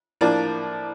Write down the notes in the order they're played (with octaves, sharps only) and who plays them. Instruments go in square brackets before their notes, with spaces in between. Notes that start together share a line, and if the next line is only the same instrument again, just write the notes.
[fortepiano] A2 F3 A#3 D4 D5